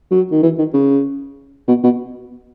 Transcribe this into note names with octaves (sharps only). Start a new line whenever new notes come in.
F#3
D#3
E3
D#3
C#3
B2
B2